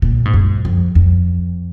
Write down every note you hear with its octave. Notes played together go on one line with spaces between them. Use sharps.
A#2
G#2
F#2
F2
F2